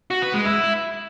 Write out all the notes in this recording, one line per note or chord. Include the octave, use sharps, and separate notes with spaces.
F#4
B4
G#3
E4